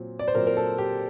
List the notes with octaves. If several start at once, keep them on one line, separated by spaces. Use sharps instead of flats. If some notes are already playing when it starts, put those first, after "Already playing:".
Already playing: A#2 F#3 C4
D5
C5
A#2 F#3 C4 A#4
A#4
A4
G4